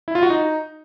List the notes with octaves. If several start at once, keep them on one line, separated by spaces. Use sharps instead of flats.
E4
F4
F#4
D#4